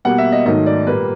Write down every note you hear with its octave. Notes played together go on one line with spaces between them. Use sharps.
B2 G3 A#3 F#5
E5
D#5
G#2 D#3 F#3 A3 D#5
D5
A#2 G3 A#3 B4